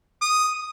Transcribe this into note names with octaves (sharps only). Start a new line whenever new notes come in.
D#6